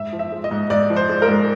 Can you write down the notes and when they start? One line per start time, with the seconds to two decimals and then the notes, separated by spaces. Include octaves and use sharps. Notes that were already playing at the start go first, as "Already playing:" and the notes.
Already playing: G#2 E5
0.13 F3
0.19 E5
0.32 G#3
0.44 D#5
0.51 G#2
0.70 G#2 D5
0.90 F3
0.96 C5
1.09 G#3
1.22 A#4
1.28 G#2